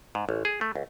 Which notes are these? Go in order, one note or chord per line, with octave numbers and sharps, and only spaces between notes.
G#2
A1
G#4
A3
C#2